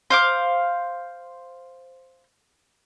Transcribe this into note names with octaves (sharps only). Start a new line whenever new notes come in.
C5 F5 D6